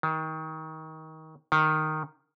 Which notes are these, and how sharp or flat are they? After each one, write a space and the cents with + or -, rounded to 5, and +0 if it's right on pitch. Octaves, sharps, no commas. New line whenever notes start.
D#3 +25
D#3 -5